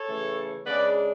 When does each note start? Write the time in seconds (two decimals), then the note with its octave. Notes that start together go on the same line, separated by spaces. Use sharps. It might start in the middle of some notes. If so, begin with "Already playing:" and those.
Already playing: A4 C#5
0.09 C#3 E3 A3
0.66 C#3 G#3 D4 B4 D5